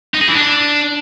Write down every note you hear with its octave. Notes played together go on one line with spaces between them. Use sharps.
D#4
G#4
E3
D4